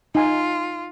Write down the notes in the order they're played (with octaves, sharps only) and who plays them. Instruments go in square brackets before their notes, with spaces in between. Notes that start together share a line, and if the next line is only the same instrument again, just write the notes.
[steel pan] D#4 G#5 [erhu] F4